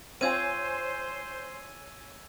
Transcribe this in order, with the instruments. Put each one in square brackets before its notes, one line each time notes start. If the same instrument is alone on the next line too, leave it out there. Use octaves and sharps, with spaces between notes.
[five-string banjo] C4 F4 [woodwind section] C5 [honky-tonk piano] C#5 G#5 [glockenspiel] E6 G#6 D#7